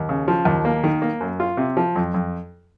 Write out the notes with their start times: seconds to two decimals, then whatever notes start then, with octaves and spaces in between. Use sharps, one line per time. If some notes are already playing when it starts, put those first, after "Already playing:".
Already playing: D#2
0.09 C#3
0.28 F3
0.45 D#2
0.65 A#3
0.84 D#3
1.02 A#3
1.21 F#2
1.40 F4
1.57 C3
1.77 F3
1.96 F2
2.14 F2